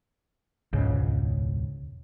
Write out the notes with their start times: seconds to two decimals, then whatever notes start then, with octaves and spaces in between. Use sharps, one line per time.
0.73 E1 C#2 G#2 C#3